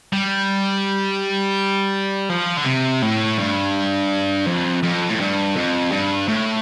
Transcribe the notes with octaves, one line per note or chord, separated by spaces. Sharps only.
G3
F3
D3
C3
A2
G2
F2
F2
A2
G2
F2
G2
A2